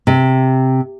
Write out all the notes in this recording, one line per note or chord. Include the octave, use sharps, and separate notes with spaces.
C3